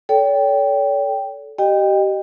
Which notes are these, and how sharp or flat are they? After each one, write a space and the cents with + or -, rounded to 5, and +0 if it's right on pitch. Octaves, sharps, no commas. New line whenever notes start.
A4 -10 C#5 +45 G5 +0
G4 -25 D#5 -20 G5 +20